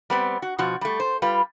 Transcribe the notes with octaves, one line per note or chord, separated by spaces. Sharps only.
G3 B3 C4
F#4
B2 F3 F#4
G3 A3
C5
G3 F4 B4